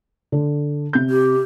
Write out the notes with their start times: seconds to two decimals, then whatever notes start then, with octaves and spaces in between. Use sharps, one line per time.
0.32 D3
0.93 C3 G6
1.10 G4